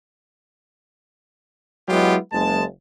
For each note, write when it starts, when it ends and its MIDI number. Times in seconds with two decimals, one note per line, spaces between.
1.89 2.16 54
1.89 2.16 56
1.89 2.16 59
1.89 2.16 64
1.89 2.16 65
1.89 2.16 67
2.32 2.64 30
2.32 2.64 56
2.32 2.64 81